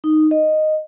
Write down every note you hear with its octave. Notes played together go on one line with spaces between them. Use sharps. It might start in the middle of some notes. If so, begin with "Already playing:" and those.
D#4
D#5